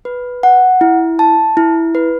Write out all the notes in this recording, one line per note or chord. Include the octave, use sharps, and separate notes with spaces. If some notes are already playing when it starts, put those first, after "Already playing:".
B4
F#5
E4
A5
E4
B4